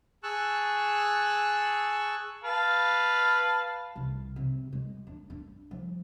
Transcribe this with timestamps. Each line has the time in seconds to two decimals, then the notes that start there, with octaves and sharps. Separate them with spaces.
0.23 G#4 A5 C#6 E6 F#6
2.44 B4 F5 A5
3.96 C2
4.36 C3
4.73 G#3
5.07 D4
5.30 D4
5.71 F3